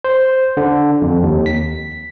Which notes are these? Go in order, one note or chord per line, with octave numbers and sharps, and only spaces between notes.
C5
D3
F2
D#2
B6